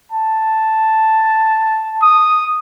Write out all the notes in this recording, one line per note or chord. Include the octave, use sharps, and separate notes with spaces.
A5
D#6